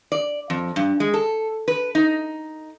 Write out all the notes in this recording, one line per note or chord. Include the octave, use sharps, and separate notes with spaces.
D5
F2
G2
G#3
A4
B4
D#4